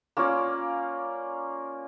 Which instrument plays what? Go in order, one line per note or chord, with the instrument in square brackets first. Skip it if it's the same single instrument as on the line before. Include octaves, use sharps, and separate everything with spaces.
[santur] A#3 C#4 F4 D5